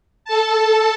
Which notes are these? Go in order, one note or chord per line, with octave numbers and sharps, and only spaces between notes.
A4 A5